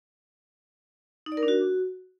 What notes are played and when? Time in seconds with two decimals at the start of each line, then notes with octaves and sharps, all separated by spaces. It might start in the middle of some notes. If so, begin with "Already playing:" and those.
1.26 D#4
1.32 D5
1.37 A#4
1.43 D4
1.48 F#4